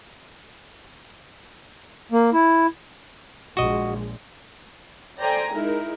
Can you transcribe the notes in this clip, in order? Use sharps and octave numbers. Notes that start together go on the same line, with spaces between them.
A#3
E4
A#1 G#3 F#4 D#5
A4 C5 D5 G5 G#5 A#5
G#3 D#4 E4 A#4